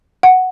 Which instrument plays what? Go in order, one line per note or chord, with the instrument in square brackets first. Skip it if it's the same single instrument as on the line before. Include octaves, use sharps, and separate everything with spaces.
[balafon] F#5